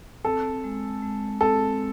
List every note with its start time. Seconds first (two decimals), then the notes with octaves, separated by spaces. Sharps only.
0.25 C4 A4
0.64 G#3
1.02 G#3
1.41 C4 A4